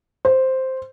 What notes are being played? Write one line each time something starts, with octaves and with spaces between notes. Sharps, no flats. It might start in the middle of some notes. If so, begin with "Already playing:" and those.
C5